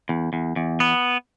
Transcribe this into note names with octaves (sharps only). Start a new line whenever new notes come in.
E2
E2
E2
B3